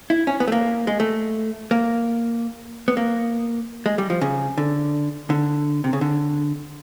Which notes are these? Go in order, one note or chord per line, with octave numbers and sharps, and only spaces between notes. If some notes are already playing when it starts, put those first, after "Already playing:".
E4
C#4
B3
A3
A#3
G#3
A3
A#3
B3
A#3
G#3
G3
F3
C#3
D3
D3
C3
C#3
D3